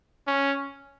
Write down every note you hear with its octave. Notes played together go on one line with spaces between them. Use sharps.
C#4